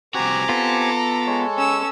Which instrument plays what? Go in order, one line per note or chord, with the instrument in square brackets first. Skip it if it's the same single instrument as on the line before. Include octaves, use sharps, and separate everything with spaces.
[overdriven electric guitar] C2 F#4 [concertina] C4 G4 G#5 [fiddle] A#5 D6
[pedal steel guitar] B3 F4 [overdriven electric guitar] A4
[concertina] G#3 C#5
[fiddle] C#4 E6